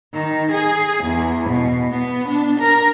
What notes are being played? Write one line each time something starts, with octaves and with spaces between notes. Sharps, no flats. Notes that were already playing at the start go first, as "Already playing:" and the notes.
D#3
G#4
E2
B2
B3
D4
A#4